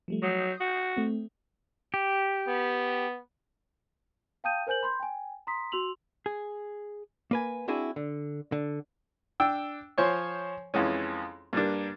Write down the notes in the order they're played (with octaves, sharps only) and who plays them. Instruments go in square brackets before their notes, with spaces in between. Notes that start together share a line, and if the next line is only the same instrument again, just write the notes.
[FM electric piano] F3 G3 A3
[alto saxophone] F#3 [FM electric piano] D#6 G6 C7
[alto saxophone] F#4
[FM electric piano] A3 C4
[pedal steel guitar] G4
[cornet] B3
[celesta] F5 G5 A5 D#6 G6 D#7
A#4 C5 G#5 G6 F#7
B5 C6 G6
G5 G#5
A#5 C6 D#6 B6
F#4 C6 E6 F7 F#7
[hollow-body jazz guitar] G#4
A#3 B4 G#5
C4 D4 E4 F#4 G#4 G#5
D3
D3
[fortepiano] D4 G5 E6
F3 C5 C#5 G#5 C6 C#6
F2 E3 G#3 C#4
G2 G3 A#3 D4